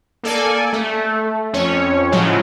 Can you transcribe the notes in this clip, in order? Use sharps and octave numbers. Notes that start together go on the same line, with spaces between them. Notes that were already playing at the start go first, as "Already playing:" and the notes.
A#3 A4 D5 G#5
A3
F2 C#4 C#5
A2 C#3 F3 F#3 G#3